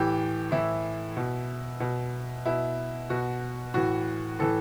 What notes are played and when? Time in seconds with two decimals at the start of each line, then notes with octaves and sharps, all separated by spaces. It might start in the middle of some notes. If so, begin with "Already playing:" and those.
Already playing: A2 E3 G4
0.51 A2 E3 E4
1.17 B2
1.80 B2
2.46 B2 E4
3.10 B2 F#4
3.74 A2 E3 F#4
4.39 A2 E3 A4